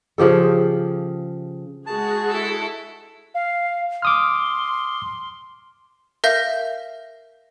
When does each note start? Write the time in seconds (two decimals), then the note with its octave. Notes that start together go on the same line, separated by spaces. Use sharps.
0.18 C#3 F3 G4 A4
1.87 G#3 F#4 G#4 A5
2.29 E4 A4
3.34 F5
4.02 C6 D6 D#6 F6
6.24 A#4 E5 F5 G6 A#6